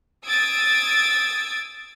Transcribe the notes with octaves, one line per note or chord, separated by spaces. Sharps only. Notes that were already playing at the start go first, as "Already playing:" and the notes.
D#6 E6 G#6 A6 D7